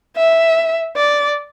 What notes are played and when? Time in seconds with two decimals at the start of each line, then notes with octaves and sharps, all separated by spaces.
0.17 E5
0.96 D5